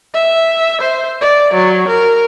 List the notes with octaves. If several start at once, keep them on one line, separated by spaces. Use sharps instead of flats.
E5
C5
D5
F#3
A#4